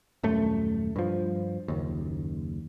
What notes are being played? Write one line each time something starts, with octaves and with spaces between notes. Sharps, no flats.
D#1 F#2 A3
G2 F3
F#1 D#2